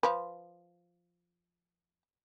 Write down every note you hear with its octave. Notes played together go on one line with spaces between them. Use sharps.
F3 B4